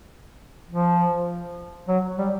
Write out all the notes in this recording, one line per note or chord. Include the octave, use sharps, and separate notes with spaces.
F3
F#3
G3